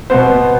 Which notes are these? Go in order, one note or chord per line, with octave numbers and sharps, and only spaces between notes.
B2 B3 C5